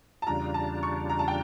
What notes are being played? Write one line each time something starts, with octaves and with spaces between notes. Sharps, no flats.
A5
E2 C#3 G3 D4 F4 A#5
A5
C#6
A#5
A5
G5